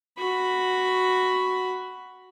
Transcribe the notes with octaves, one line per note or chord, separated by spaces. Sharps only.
F#4 B5